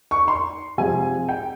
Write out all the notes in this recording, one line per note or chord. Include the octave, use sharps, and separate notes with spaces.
C#6
C6
C3 F3 G#3 G#5
G5